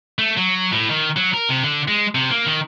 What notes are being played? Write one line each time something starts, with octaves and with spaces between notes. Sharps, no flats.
A3
F#3
A2
D#3
F#3
A#4
C3
D3
G#3
C3
A#3
D#3